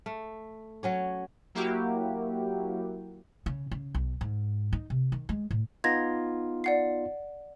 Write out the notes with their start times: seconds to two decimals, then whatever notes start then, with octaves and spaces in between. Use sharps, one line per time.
0.06 A3
0.83 F#3 C#4 C#5
1.55 F#3 A#3 E4 F#4 G4
3.46 C#3
3.71 C#3
3.95 B1
4.21 G#2
4.73 D#4
4.90 C3
5.12 D#3
5.29 G#3
5.51 A2
5.84 B3 D#4 F4 G#6 A#6
6.64 D5 F#5 C7